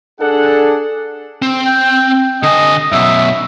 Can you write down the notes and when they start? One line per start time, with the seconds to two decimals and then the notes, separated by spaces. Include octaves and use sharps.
0.20 D4 G#4 A4 F#5
1.42 C4
1.66 G5
2.43 D3 D#5 G#5
2.92 F#2 B2 E5